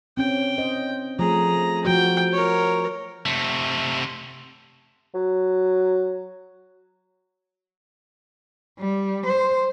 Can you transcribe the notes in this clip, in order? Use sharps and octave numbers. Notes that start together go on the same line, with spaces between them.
C4 C#4 G5
C5 D#5
F3 A3 G#4 A#5
F3 F#4 G5
A#4 C#5
C3 A3
F#3
G3
C5